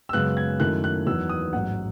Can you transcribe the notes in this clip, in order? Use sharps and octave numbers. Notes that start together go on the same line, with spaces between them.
E6
F#2 C#3 G#3 B3 F#6
G#6
F#2 D#3 A3 E4 F#6
F#6
E2 D#3 F#3 B3 E6
D#6
A1 G#2 F#3 F#5